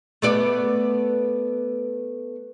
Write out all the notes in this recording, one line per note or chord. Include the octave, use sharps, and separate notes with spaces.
A3 B3 D5